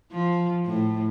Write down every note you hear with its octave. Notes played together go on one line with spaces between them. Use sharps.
F3
A2